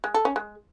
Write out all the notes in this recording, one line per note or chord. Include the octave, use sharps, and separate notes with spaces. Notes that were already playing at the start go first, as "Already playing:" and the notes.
G#3
A4
C#4
G#3